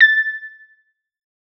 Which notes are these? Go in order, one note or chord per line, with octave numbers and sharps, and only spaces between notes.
A6